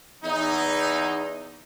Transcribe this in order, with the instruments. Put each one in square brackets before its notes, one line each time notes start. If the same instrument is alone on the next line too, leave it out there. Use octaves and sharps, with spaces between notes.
[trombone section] E2 [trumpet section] D#4